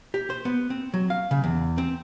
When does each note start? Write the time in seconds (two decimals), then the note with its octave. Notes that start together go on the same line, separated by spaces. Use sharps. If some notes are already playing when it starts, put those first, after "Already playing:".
0.14 G4
0.30 C5
0.45 B3
0.70 C4
0.94 F#3
1.10 F5
1.31 C#3
1.44 E2
1.78 C4